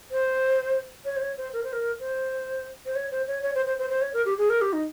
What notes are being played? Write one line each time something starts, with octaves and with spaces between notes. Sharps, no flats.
C5
C#5
C5
C#5
C5
A#4
C5
A#4
C5
C5
C#5
C5
C#5
C#5
C5
C5
C5
C5
C#5
A#4
G4
G#4
A#4
G4
D#4